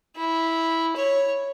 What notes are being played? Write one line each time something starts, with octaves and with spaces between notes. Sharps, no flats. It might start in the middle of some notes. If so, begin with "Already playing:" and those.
E4
C#5